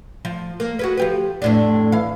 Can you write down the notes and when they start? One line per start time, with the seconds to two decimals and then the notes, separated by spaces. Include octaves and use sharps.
0.25 F3
0.60 A#3
0.79 F#4 G#4 B4
0.97 F3 G4 B4
1.42 F2 A2 D4
1.92 E3 F5